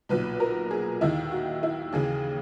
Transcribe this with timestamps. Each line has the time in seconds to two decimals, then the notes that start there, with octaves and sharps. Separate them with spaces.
0.09 B1 A#2 B4
0.40 A#4
0.71 G#4
1.01 D#2 D#3 E4
1.32 F#4
1.63 E4
1.93 D#2 C#3 E3 G#4